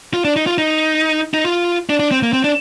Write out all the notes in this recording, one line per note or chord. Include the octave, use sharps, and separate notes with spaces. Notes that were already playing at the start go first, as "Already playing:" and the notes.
F4
D4
D#4
F4
D#4
D#4
F4
D4
D4
C4
A#3
C4
D4